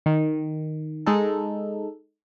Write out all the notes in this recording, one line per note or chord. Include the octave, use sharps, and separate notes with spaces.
D#3
G#3 D#4 A4